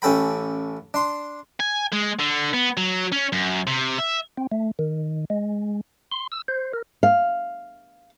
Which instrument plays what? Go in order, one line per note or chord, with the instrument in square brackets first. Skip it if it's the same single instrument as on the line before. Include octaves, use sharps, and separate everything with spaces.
[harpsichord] A1 C#4 A4 G5 B5
D4 C6
[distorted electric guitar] G#5
G#3
D3
B3
F#3
C#4
F#2
C3
E5
[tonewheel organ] C4
A3
D#3
G#3
C6
E6
C5
A#4
[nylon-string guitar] F5